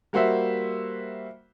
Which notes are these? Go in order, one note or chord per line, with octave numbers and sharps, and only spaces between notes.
G3 A#3 F#4 C5 E5